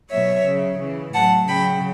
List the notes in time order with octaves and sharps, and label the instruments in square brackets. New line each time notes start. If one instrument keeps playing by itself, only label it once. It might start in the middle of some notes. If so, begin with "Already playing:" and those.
[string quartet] B2 F#3 C#5 E5
C#3 F#3
C#3 E3
A2 F#3 F#5 A5
C#3 F#3 G5 B5